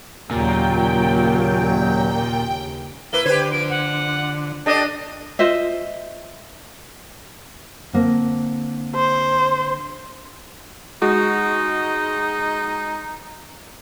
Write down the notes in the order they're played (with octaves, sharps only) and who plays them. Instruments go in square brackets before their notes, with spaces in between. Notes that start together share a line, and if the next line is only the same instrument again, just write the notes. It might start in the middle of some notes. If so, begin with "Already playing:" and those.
[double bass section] D#2 C#3 [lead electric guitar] A#2 [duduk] F#3 [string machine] G5
[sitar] A#3 E4 B4 [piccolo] G7
[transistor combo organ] D3 [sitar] G4 B4 C5 [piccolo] G#6
[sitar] F3 [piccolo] D7
[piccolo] F#5
[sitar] D4 D5 [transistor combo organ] G4 A4 [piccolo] D#5
[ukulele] F4 C5 D#5 E5
[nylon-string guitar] D3 A#3 C4
[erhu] C5
[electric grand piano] G#3 F#4 [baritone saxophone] D#4